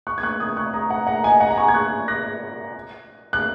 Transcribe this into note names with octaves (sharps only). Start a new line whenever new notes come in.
C#6 F#6
G#6
C#6 F#6
D#6 G#6
C#6 F#6
A#5 D#6
F#5 A#5
F#5 A#5
D#5 G#5
F#5 A#5
A#5
G#5 C#6
G#6
C#6 F#6
F#6 A#6
F#6